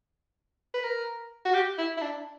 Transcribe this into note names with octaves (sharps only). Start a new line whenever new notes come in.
B4
A#4
F#4
G4
E4
E4
D4